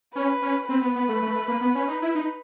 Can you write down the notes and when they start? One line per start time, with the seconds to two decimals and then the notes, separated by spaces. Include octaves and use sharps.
0.14 C#4 B4
0.42 C#4
0.69 C4 B4
0.82 B3
0.96 B3
1.09 A3
1.22 A3
1.34 A3
1.48 A#3
1.61 B3
1.75 C#4
1.88 D#4
2.02 E4
2.15 D#4